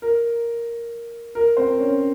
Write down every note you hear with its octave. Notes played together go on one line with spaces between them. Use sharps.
A#4
A#4
C4 C5
C#4 C#5